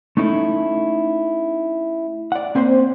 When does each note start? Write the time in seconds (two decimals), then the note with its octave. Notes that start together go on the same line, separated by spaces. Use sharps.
0.17 A3 C#4 D#4 E4 A4
2.32 D5 F#5
2.55 A#3 C4 C#4 C5 C6